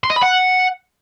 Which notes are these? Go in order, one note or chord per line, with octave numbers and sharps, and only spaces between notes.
C6
D#5
B5
F#5